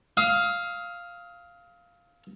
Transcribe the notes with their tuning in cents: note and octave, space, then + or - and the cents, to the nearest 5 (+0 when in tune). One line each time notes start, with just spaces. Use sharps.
F5 +0 D#6 +40